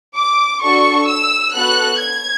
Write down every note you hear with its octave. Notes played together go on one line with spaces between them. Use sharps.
D6
D4 F#4 A4 C#6
E6
B3 F#4 A4 F#6
G#6